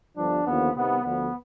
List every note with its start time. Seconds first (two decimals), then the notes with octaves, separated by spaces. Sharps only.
0.17 G1 G2 F3 D4
0.47 D#2 D3 F3 B3
0.76 C2 C3 D#3 B3
1.04 D2 D3 F3 B3